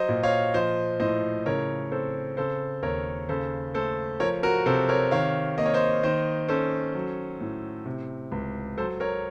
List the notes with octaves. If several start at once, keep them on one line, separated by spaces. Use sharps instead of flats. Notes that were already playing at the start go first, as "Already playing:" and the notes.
Already playing: F#3 C5 D#5
A#2
C#5 F5
F3 C5 D#5
A2 C5 D#5
C#3 A#4 C#5
C4 A4 C5
C#3 A4 C5
D#2 A#4 C#5
C#3 A4 C5
A3 A4 C5
F3 A#4 C#5
F#4 A#4
C3 A4 C5
A#4 C#5
D#3 C#5 F5
A#3 D#5
C#5
C5 D#5
D#3 C5 D#5
C#4 A4 C5
F#3
A2
C3
C#2
F#3 A4 C5
A#4 C#5